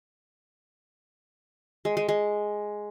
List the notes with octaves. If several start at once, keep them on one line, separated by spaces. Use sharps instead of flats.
G#3
G#3
G#3